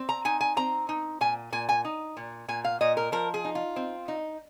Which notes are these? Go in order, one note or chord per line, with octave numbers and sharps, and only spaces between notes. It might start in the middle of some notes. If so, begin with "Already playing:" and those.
Already playing: C4
A#5
D#4 G#5
G#5
C4 A#5
D#4
A#2 G#5
A#2 G#5
G#5
D#4
A#2
A#2 G#5
F5
A#2 D#5
A#4
F3 A#4
G#4
D#4
F4
C4
D#4